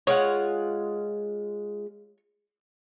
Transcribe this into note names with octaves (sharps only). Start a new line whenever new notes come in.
G#3 F4 C#5 F#5